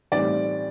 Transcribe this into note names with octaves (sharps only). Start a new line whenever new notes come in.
A2 E3 G3 C4 D#4 D5